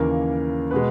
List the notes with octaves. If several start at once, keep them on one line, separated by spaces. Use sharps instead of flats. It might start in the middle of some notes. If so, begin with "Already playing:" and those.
Already playing: D#2 C#3 E3 A#3 A#4
B2 G#3 B4